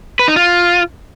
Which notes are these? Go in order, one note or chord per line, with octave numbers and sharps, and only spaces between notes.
B4
D#4
F4